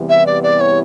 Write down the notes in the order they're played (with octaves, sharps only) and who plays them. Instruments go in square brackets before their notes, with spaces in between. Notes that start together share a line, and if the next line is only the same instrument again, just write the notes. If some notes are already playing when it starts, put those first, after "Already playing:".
Already playing: [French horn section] E2 C3 E3 G3 B3
[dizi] E5
D5
D5
C#5